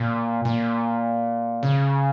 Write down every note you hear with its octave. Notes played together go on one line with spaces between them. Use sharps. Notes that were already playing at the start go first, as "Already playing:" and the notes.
Already playing: A#2
A#2
C#3